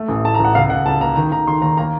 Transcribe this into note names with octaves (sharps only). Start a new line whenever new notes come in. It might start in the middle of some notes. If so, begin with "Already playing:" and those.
Already playing: A3
A1
A2 A5
A#5
A1
F#5
C#2 F5
C#2 F#5
C#2 A5
A#3 A#5
D#3 A#5
D#3 A#5
D#3 C6
D#2 A#5
A#3 A#5